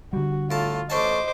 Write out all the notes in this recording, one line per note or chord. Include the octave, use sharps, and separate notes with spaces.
D3 G3 F#4
A2 F4 A5
A1 C#4 C5 D#5 A5 D6